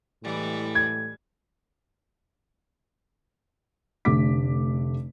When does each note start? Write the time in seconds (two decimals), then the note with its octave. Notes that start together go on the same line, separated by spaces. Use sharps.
0.23 A2 E3 G3 G#3
0.75 G#6
4.05 F1 D3 A3 D6 B6